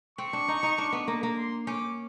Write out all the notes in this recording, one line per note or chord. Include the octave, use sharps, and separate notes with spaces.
C4 C#6
D4
D#4
D#4
D4
B3
A#3
A#3
C6
C#4 D6